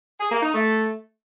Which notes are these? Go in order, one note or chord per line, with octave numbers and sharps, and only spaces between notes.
G#4
A#3
D#4
A3